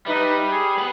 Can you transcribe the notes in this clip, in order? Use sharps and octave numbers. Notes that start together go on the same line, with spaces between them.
G3 D#4 B4 E5
G#4
B4 F#5